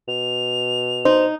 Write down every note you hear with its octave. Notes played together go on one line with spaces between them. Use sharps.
B2 F7
D#4 C5